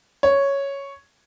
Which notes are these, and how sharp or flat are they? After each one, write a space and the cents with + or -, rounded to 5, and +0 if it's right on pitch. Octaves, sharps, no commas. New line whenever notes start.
C#5 +0